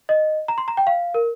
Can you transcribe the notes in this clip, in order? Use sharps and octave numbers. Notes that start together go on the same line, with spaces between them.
D#5
A#5
C6
A#5
G5
F5
A#4